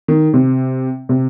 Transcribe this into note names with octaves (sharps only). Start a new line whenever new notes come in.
D#3
C3
C3